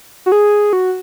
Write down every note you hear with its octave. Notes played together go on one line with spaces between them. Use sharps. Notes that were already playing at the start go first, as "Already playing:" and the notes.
F#4
G#4
F#4